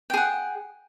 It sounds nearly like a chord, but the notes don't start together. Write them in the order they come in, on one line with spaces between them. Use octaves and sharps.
G5 G#4 F#5